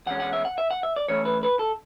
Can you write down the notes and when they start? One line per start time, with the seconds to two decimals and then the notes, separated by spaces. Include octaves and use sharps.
0.06 E2 B2 G#3 C#4 F#5
0.20 F#5
0.33 E5
0.45 F#5
0.58 E5
0.71 F#5
0.83 E5
0.96 D5
1.08 F#2 E3 A3 C#4 E4 C#5
1.25 B4
1.43 B4
1.59 A4